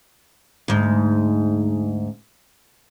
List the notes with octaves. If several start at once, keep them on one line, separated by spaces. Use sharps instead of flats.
D2 G#2